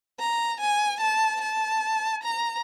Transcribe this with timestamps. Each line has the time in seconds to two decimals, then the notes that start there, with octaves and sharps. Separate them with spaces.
0.20 A#5
0.60 G#5
1.01 A5
1.41 A5
2.24 A#5